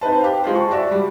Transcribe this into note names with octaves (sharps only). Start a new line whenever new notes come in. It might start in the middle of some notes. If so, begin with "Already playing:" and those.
C4 D#4 B4 A5
G4 F5
G#3 F4 C5
A5 C#6
F#4 D5 E5
G3